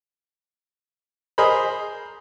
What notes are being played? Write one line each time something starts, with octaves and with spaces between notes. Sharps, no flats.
G#4 A#4 C5 D#5 B5